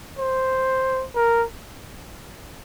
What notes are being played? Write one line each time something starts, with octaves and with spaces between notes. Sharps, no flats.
C5
A#4